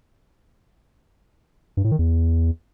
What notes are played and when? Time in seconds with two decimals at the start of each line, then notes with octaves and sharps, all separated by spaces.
1.77 G2
1.84 A2
1.92 D#3
1.99 E2